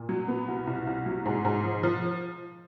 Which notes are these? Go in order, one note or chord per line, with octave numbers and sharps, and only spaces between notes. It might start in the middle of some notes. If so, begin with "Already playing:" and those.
Already playing: A#2
F#3
B3
C2
C2
C2
F#3
G#2
G#2
F3
F3